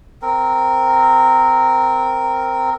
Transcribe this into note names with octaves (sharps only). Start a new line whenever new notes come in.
C4 A#4